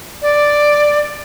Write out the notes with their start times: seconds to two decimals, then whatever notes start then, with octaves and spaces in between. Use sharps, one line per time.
0.22 D5